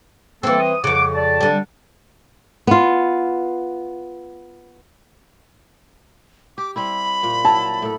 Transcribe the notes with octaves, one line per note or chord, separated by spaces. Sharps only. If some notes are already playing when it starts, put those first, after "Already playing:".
E3 A#3 C4 A4
D#6
F2 C#3 F#5 D6
D5 A5
D3 G3
B3 F4
G4 D6
G3 C4 E4 B5
A#2
F#3 E4 A5
A2 A4